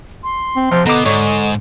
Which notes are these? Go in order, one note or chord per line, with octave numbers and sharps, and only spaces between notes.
C6
C4
C3 F3
B2 D3 D#5 A#5 D6
G#2 D3 C#5 D5